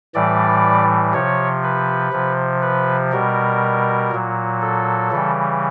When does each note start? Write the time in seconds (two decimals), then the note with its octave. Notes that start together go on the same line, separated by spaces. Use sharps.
0.15 A2 E3 G3 D5
1.13 C3 F3 C#5
1.63 B4
2.12 C3 F3
2.62 B4
3.12 B2 G3 A#4
4.12 A#2 F#3
4.61 A4
5.11 C#3 E3 G3